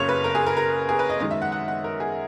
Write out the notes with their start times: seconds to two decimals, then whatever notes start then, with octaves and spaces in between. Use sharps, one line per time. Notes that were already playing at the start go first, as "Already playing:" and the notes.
Already playing: F#1 F#2 C#3 C#5
0.09 B4
0.24 A#4
0.35 G#4
0.46 A#4
0.57 A#4
0.89 G#4
0.99 B4
1.10 D#5
1.20 F#2 D#3 G#3 D#5
1.31 E5
1.42 F#5
1.52 F#5
1.68 F#5
1.84 A#4
2.00 G#4